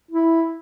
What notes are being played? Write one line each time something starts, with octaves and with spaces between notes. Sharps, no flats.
E4